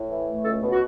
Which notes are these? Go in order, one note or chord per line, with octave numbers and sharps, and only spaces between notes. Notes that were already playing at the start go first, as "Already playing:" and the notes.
Already playing: A2
E3
A3
C#2 A4
B2
F#4